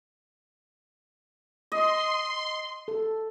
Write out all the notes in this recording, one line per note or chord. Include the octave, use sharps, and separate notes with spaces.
D#5 C6
A4